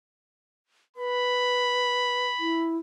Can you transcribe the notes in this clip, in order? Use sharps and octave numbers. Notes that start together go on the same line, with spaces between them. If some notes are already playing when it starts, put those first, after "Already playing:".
B4 B5
E4